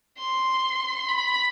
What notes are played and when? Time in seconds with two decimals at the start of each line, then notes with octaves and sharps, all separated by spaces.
0.18 C6
1.08 B5